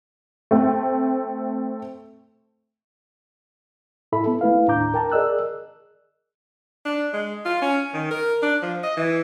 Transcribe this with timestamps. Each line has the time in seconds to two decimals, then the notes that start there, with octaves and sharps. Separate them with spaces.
0.51 A3 C4
4.12 A2 E4 A4 E5 B5
4.26 B3 A4
4.41 A3 E4 B4 F5
4.68 D#2 A2 D4 A#5 D6 G6
4.94 A#4 G5 A5 A#5
5.12 G#4 A#4 D5 D#5 E6 F#6
6.85 D4
7.13 G#3
7.45 F4
7.62 C#4
7.94 D#3
8.11 A#4
8.42 D4
8.62 F3
8.83 D#5
8.97 E3